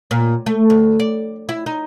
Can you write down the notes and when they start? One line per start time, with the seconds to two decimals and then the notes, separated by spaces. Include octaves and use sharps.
0.11 A#2
0.46 A3
0.70 D2
1.00 D5
1.49 E4
1.66 D#4